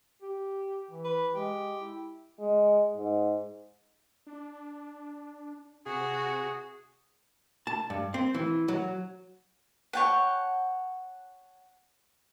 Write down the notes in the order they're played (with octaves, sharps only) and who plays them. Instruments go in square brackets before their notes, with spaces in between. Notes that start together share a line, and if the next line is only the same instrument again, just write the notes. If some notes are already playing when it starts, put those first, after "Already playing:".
[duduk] G4
E3
[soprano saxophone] B4
[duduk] G#3 [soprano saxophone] G4
[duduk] E4
[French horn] G#3
G#2
[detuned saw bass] D4
[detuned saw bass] C3 [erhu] F#4 [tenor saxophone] G#4
[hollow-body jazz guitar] A5
G2
C4
E3
F#3
[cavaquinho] C#5 G5 A5 [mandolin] F#5